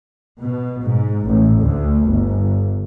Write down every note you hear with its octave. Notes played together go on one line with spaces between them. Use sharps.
B2
G#2
A1
D2
G1